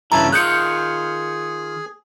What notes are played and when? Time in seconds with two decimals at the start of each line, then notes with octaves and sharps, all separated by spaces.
0.12 G2 C#3 E3 E4 A5 A#5
0.32 D#3 F4 G#4 F#6 G6 C#7